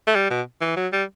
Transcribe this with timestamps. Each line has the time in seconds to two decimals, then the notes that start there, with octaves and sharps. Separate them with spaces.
0.07 A3
0.15 G3
0.30 B2
0.61 E3
0.76 F#3
0.93 G3